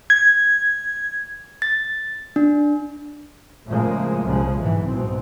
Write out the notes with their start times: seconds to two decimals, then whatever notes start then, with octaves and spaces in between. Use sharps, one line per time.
0.10 G#6
1.62 A6
2.36 D4
3.66 A2 C#3 F3 G#3 A#3
4.23 C2 C#3 F3 G#3
4.58 B1 G#2 E3
4.87 G#2 B2 C4